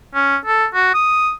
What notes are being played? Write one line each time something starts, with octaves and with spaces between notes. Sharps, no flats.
C#4
A4
F#4
D#6